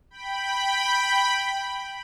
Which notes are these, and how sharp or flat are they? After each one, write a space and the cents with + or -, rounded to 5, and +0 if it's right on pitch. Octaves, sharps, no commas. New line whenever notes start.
G5 +0 B5 +0